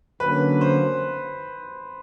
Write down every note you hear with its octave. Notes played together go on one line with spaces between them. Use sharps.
D3 F#3 A#3 C#4 B4
C5